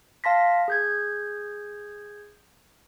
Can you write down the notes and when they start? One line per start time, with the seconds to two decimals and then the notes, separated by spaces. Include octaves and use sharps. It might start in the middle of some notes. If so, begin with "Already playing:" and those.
0.24 F5 A5 C6 A#6 B6
0.68 G#4 G6 G#6